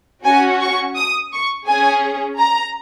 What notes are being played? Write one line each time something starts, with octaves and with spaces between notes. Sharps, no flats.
C#4 F#4 G#5
C#6
D#6
C#6
C#4 G#4 G#5
A#5